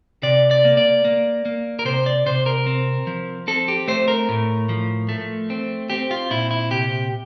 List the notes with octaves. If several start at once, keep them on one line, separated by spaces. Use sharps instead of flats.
C3 D5
D5
A#3
D5
A#3
A#3
A#4
C3 C5
D5
C3 C5
A#4
C4
F3
C4 A4
G4
A3 C5
A#4
A2
F3
A3
C4
C4 G4
F4
A#2 E4
E4
C3 G4